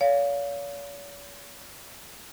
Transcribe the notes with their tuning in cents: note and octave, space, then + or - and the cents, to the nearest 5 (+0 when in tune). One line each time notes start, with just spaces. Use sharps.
C#5 +45 F5 +0